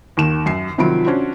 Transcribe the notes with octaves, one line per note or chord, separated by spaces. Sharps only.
D#2 D#3 E7
F#2 C7
C3 D#3 F3 F#3 B5 D7
C#4 D4 F#4 C5